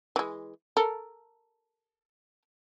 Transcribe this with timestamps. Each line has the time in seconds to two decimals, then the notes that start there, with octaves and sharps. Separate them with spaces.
0.16 E3 G#3
0.77 A4 A#4